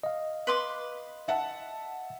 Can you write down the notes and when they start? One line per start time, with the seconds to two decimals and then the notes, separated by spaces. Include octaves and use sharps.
0.03 D#5 F5
0.47 B4 C6 D6
1.28 E5 F#5 A5